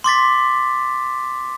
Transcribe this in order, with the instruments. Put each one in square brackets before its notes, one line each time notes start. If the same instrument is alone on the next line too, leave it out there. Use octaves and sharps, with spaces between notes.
[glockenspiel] C6 D6 A6 B6